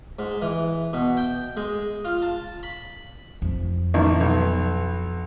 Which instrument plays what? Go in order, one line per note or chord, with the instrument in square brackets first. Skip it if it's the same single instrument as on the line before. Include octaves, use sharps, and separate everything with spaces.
[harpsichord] G#2
E3
B2
G5
G#3
F4
A5
B5
[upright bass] F2
[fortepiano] A1 D#4
B1